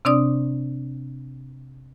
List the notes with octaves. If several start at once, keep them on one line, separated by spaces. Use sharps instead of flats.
C3 C4 D4 D5 D#6